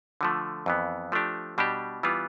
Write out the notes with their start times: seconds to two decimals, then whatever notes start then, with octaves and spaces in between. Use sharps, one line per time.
0.21 D3 F3 A3
0.66 F2 E3 B3
1.12 F3 A3 D4 G4
1.58 B2 G3 D4 G4
2.03 E3 G3 B3 F4